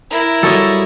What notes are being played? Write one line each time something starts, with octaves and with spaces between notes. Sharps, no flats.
E4 A#4
F#3 G3 A4 C#5 D#5